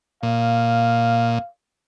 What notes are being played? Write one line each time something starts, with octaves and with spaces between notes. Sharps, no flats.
A#2 F5